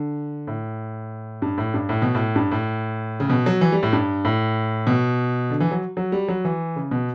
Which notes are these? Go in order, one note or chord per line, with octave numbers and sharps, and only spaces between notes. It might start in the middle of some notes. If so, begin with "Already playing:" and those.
Already playing: D3
A2
G2
A2
G2
A2
B2
A2
G2
A2
C#3
B2
F#3
E3
G3
A2
G2
A2
B2
D3
E3
F#3
F#3
G3
F#3
E3
C#3
B2